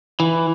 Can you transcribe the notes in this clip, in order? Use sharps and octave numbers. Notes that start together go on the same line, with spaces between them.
E3